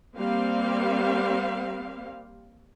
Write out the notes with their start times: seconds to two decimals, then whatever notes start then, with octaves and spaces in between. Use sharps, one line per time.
0.16 G3 A#3 C4 F5